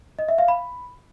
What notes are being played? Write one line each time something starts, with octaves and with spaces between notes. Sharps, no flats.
D#5
E5
F5
B5